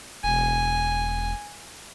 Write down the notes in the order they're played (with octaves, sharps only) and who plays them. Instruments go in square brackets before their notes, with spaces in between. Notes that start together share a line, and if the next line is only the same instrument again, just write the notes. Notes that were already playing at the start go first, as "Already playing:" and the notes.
[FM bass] E1 [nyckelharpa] G#5